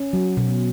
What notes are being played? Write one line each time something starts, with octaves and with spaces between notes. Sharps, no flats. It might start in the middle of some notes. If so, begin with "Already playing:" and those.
Already playing: C#4
F#3
B2